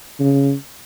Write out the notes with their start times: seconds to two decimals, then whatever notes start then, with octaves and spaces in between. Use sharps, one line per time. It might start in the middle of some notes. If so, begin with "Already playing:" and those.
0.20 C#3